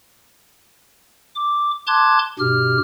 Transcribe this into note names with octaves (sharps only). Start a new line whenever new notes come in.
D6
A5 C6 D6 F#6 G#6
G2 B2 G4 F6